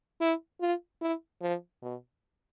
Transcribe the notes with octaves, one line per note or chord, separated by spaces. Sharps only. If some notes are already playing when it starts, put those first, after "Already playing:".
E4
F4
E4
F3
B2